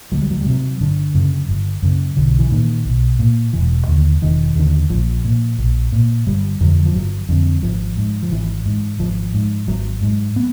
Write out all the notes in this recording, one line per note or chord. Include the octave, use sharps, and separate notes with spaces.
D2 F#3
G3
F#3
G3
C3 F#3
G1 D3
F#2 C#3
G1
F#2 C#3
B1 D3
E3
A#2 D#3
B1
A#2
E1 E3
D#2 D3
E1 D#3
D#2 D3
A#1 F3
A#2
A#1
A#2
G1 G3
F2 D3 F#3
F3
G1 F#3
F2 D3
G#1 F3
G#2
F3
G#1 E3
G#2
G#1 F3
G#2
G#1 F#3
G#2
B3